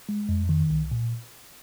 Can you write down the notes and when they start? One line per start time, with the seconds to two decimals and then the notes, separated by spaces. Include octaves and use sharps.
0.09 G#3
0.29 F2
0.49 D#3
0.70 C2
0.91 A#2